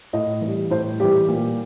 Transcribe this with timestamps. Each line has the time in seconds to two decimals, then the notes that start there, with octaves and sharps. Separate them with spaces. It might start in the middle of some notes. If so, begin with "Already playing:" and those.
0.13 A2 D#5
0.41 E3 G3
0.70 A2 C5
1.00 E3 G3 G4
1.28 A#2